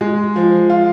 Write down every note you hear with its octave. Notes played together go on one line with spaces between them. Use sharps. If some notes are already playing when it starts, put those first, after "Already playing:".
G#3
F3
F4